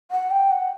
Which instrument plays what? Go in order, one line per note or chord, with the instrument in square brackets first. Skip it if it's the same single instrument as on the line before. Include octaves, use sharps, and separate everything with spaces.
[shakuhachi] F#5
G5
F#5